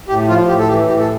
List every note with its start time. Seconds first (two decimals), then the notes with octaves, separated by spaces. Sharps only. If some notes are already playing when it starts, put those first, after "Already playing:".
0.09 A2 G4
0.28 F3 F4
0.48 A2 G4
0.59 A4
0.68 E3 G4
0.88 A2 G4
0.99 A4